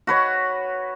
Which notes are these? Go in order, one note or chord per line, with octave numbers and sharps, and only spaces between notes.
F#4 B4 C#5